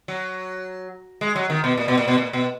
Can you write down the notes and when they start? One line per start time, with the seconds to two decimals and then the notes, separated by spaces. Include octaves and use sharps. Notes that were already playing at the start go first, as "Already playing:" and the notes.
0.08 F#3
1.21 G#3
1.36 F#3
1.50 D#3
1.64 B2
1.77 A#2
1.88 B2
1.98 A#2
2.08 B2
2.18 A#2
2.33 B2